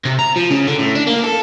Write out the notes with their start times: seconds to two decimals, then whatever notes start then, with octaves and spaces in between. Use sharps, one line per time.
0.05 C3
0.19 A#5
0.36 F3
0.50 C#3
0.67 D3
0.79 A2
0.95 D4
1.07 A#3
1.23 A4